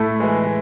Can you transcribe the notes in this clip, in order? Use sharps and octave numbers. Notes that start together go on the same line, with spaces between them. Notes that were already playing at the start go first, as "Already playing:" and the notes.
Already playing: A2 A3
E3 G#3